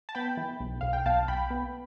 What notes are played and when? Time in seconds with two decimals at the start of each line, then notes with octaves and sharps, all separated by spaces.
0.09 A5
0.15 B3 G5 B5
0.37 E3
0.60 B1
0.81 B1 F5
0.93 G5
1.06 B1 F5 A5
1.28 B1 G5 B5
1.50 B3